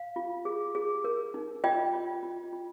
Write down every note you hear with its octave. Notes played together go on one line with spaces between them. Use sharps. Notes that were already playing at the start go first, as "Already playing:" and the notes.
Already playing: F5
F4
G#4
G#4
A#4
D#4
F4 D#5 G5
F4
F4
F4